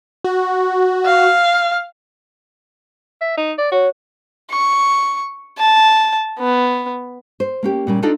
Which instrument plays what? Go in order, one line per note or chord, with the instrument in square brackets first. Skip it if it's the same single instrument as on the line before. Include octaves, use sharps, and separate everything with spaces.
[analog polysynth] F#4
[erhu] F5
[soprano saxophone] E5
D#4
D5
[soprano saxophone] F#4 [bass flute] C#5
[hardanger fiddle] C#6
A5
B3
[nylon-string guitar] C5
A#3 C#4 G4
A#2 G3 C#4
D4 D#4 F4 A4 D5 D#5